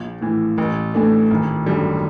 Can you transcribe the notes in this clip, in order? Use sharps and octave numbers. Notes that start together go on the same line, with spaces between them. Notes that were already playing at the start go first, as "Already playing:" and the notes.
Already playing: A#1
A2 E3
A1
A2 E3 A3 D4
G#1
F#2 D3 G3